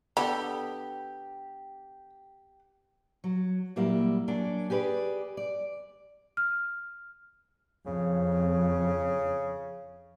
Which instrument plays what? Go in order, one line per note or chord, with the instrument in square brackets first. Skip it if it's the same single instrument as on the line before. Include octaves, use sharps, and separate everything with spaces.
[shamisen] D3 B5 [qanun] B3 A4 [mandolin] G4
[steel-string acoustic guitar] F#3
A#2 F#3 G3 A#3 E4
F#3 A#3 C#4 D4
G4 G#4 B4 C5 D5
D5
[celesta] F6
[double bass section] F2 [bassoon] C#3